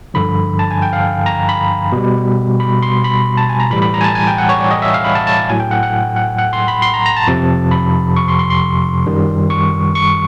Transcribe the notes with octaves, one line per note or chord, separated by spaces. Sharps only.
G2 D3 F3 B5
A5
G#5
G5
F5
A#5
B5
B2 G3
B5
C6
B5
A5
G#5
A#5
A2 E3 G3 B5
B5
A#5
G#5
A5
G#5
G5
F#5
C#5
D5
D#5
E5
F5
B5
A5
A5
A2 F#3 G#5
G5
F#5
F#5
F#5
F#5
C6
B5
C6
A#5
A#5
A5
F2 C3 F3
B5
C#6
C6
C6
C6
F#2 D#3 G3
C#6
C#6